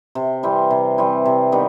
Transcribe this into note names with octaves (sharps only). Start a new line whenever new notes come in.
C3
E3 G3 C4
C3
E3 G3 C4
C3
D#3 G3 B3